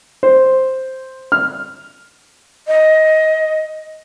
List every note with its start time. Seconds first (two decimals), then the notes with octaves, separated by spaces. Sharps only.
0.23 C5
1.32 F6
2.67 D#5